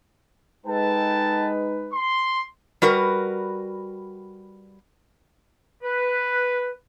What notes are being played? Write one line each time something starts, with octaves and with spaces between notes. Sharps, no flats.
G#3 D#4 A4 B4 G5 A5
C6
G3 F#4 A#4 B4
B4